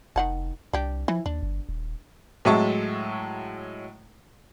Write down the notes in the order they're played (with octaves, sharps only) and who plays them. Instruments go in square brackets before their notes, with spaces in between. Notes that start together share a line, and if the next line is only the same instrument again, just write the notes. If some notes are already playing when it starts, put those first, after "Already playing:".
[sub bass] F1 [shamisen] D#3 F#5 A5
[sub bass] C2 [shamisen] D4 G4
[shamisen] E3 [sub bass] F3
[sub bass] D#2 [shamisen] D4
[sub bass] G1
D#1
[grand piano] A2 F#3 G#3 E5 A5 C#6